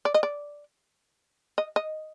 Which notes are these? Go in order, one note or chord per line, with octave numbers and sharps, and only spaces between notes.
D5
D#5
D5
D#5
D#5